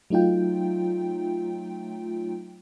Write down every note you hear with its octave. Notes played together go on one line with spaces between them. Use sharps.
F#3 A3 D#4 F4 G5